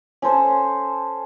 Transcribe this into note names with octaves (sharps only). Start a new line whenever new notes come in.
C#4 A4 C5